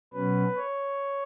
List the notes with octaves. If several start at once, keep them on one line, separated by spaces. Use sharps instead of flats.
B2 F#3 C#4 B4
C#5